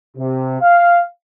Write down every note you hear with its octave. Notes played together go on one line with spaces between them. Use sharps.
C3
F5